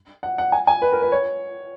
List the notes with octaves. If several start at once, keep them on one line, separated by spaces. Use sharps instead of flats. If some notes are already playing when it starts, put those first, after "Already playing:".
F#5
F#5
G#5
G#5
B4
A#4
B4
C#5